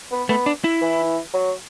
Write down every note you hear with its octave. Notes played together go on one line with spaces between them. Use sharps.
B3
A3 B3
D4
E4
E3
F#3